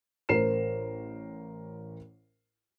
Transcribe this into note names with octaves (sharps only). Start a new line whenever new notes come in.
A1 A#4 C5 C7 E7